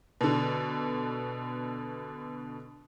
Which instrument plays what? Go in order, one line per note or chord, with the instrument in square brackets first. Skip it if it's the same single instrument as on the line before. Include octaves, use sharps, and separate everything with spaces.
[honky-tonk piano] B2 D3